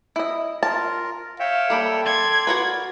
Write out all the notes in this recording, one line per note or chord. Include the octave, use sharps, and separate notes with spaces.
E4 D#5
F4 A#4 A5
C#5 E5 F5 G5
G3 A#3 A4 B5
D5 C6 G#6
F#4 A#4 B4